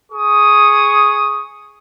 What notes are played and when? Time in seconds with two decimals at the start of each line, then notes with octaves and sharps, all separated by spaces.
0.12 G#4 C#6 D#6